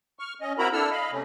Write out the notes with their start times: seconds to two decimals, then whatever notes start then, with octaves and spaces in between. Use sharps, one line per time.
0.19 C#6 F6
0.41 C#4 D#5
0.58 C4 E4 F#4 A#4 A#5 B5
0.73 D4 E4 A4 E6 F6
0.91 D#5 F5 B5
1.11 C3 A3 C#4